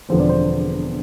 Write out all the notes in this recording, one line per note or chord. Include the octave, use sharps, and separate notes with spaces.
E1 E2 D3 F3 C4 C5
D5
C5